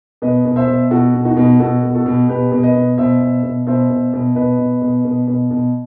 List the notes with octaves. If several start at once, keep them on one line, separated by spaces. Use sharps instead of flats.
B2 B4 D#5
B2
C5 E5
B2
B2 F#4 A4
B2
D#4 F#4
B2
B2 F#4 A4
B2
F#4 A4
B2
B2 G4 B4
B2
B4 D#5
B2
B2 C5 E5
B2
B2
B2 C5 E5
B2
B2
B2 B4 D#5
B2
B2
B2
B2
B2